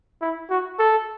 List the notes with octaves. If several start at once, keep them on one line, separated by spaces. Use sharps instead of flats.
E4
F#4
A4